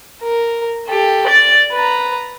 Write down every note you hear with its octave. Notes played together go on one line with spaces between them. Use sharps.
A#4
G4 A4
D5 A6
B4 A#5